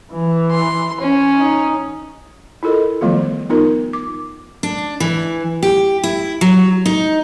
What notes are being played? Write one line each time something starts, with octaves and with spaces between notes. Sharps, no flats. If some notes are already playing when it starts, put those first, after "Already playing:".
E3
C6
C#4
D#4
E4 F4 A4 A#4 D#5
D#3 F3 G3 A3 B3 F4
B3 D#4 F4 A#4
D6
D4
E3
G4
E4
F#3
D#4